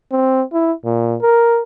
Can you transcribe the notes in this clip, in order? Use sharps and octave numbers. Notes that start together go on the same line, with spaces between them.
C4
E4
A#2
A#4